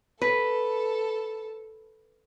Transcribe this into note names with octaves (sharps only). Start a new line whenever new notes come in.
A4 B4